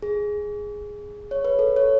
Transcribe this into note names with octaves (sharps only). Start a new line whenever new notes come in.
G#4
C#5
B4
A4
C#5